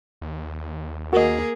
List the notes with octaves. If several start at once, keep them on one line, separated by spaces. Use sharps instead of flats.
D#2
A#3 F#4 G#4 A#4 D#5